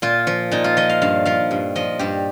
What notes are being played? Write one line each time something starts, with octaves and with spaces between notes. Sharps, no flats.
A#2 F4
F3
A#2 D#4
F4
F3 D#5
F5
G2 F5
F3 F5
G2
F3 D#5
G2 G4